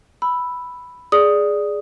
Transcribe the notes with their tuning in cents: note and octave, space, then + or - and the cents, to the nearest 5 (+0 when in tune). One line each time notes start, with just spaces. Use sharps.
B5 +0 E6 +0
G#4 +0 D5 +0 D#6 +0